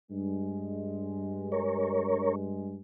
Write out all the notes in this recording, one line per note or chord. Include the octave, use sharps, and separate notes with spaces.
G2 G#3
A#4 C#5